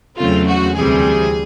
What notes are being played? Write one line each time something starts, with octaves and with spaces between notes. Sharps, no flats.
E2 C#3 F#3 A3 C4 F4
F#4
D2 C3 E3 G3 C4 G#4